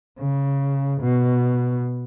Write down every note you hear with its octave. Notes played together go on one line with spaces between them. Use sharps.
C#3
B2